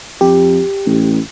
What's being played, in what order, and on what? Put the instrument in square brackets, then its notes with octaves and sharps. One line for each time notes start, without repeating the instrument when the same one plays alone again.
[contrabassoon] F2 [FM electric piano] G4
[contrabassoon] A1